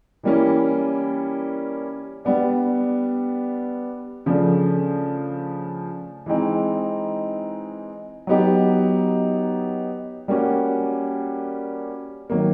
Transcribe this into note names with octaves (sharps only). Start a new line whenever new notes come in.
E3 G3 A#3 C#4 E4
G3 B3 D4
C#3 F3 A3 D4
E3 G#3 C4 D#4
F#3 B3 D#4 G4
G3 A#3 C#4 F#4
D#3 F#3 A#3